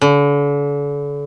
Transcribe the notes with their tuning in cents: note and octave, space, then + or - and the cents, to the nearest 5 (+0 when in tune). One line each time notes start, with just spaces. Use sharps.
D3 -40